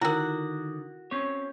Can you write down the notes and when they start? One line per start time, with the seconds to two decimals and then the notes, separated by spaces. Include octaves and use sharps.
0.01 D3 D#3 E4 F#4 A#4 F#5
1.11 C4 C#4 C#5